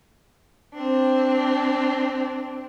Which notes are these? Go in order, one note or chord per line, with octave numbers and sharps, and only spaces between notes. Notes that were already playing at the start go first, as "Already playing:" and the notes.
C4 D4